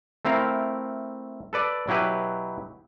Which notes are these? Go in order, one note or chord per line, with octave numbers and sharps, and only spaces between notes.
A3 C4 E4 A#4 F5
A4 B4 D5
B2 F#3 E4 G4 B4